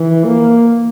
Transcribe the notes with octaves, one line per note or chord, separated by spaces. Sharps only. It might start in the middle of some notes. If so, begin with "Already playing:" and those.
Already playing: E3
A#3